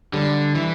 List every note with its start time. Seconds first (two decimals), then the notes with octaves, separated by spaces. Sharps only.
0.13 D3 G3
0.55 E3